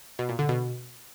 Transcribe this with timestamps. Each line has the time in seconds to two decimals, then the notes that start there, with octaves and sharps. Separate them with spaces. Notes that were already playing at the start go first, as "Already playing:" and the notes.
0.19 B2
0.29 A#2
0.39 D3
0.49 B2